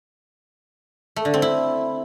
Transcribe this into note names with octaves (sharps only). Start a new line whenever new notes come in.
A3
D3
C4
E4